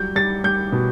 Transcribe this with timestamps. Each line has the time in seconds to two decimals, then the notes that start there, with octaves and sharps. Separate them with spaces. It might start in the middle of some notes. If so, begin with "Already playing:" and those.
Already playing: F#3 G3 G6
0.15 G3 A6
0.44 G3 G6
0.72 B2